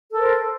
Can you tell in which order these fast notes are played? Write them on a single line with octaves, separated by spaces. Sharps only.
A4 A#4 C5